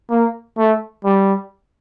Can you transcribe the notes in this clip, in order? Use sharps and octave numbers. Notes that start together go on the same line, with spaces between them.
A#3
A3
G3